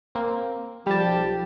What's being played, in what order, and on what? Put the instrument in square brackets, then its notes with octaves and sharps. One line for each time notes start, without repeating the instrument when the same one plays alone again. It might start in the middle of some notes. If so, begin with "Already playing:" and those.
[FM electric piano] A#3 C4
[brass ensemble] B1 F3 [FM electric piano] G3 A5 [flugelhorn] G4